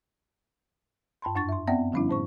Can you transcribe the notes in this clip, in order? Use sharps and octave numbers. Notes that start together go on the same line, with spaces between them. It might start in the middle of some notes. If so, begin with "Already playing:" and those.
G2 A5 B5 C6
F#2 D4 C#6 A6
E5 C6
B3 C4 D5 E5 F#5 G5
D3 F3 G3 C#4 D4 E4
A2 C5 C#6